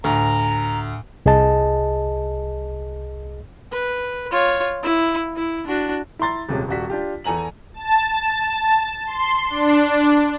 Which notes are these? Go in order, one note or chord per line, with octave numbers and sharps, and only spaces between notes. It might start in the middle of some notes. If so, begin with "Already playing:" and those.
D2 A2 A#5
C2 G#4 D#5 A5
B4
F4 C#5
E4
E4
D4 F#4
E4 A#5 C6 A6
D#1 C3 G#3 C#4
D#1 G3 F#4 B6
D4 F4 G4
E2 A4 G#5 A#5 F#7
A5
C6
D4